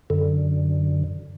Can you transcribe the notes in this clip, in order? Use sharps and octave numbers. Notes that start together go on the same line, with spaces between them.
F#2 D3